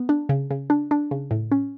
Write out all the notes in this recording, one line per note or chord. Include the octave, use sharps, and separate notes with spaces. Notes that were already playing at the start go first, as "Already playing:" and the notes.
Already playing: B3
D4
C#3
C#3
D4
D4
C#3
A2
C#4